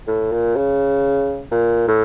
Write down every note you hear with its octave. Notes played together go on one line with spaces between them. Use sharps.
A2
A#2
C#3
A#2
A2